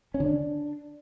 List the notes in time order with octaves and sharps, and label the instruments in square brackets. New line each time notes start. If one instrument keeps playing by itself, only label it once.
[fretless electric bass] C#4
D3
D4